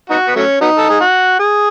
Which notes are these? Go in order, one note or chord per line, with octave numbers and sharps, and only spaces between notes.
B3 D#4 F#4
B3
F#3 A3 C#4
F#3 B3 D#4
A4
G#4
F#4
G#4